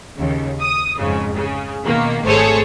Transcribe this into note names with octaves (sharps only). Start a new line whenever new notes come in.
D#2 C#3
D#6
F2 G#2 C#3
C#3
B2 D#3 A#3
G#1 A3 G#4 A4 C5 C#5